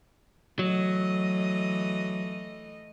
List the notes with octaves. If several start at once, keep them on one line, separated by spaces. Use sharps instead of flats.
E3 F#3 A3 D#5